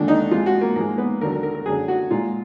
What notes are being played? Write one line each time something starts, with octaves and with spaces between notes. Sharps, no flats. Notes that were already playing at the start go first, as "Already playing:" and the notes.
Already playing: D#2 D3 F3 G#3 D4
D#4
F2 F3 G#3 F4
F#4
A#3
G#2 F3 G#3 A#3
B3
D#2 D3 F#3 A#4
A#4
A#4
A#4
F#2 D3 F#3 G#4
F#4
A#2 G#3 F4